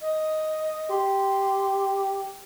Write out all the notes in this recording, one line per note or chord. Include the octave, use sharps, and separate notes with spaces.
D#5
G4 C6